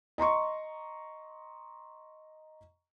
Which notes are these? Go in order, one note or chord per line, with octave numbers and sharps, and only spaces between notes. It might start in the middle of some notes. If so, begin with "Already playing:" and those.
D#5 A#5 C6 C#6